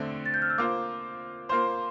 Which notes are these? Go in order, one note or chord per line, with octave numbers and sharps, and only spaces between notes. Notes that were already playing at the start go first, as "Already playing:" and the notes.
Already playing: D3 A3 C4
A6
G6
F6
E6
A#3 F4 C5 D6
A#3 F4 C5 C6